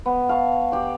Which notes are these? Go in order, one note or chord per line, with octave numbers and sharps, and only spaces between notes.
B3
F5 A5 C#6
G4 D5